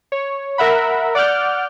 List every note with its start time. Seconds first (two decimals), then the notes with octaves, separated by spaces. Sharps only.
0.12 C#5
0.58 A#4 E5 F#5 B5
1.15 D5 F#5 D6 F6 G6